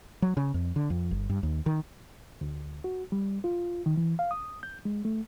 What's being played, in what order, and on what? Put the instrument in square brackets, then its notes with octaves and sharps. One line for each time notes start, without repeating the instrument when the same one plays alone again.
[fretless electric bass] F#3
C#3
F2
D3
F2
G1
G2
D#2
D#3
[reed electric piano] D2
F#4
G3
F4
D#3
E3
F5
D#6
G6
G#3
A3